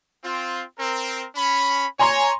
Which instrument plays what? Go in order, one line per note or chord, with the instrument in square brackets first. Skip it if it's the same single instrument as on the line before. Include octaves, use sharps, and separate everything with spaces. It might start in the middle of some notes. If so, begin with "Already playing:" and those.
[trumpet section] C4 F4
C4 A#4
C#4 B5
[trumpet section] C#5 [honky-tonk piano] G#5 A#5 C6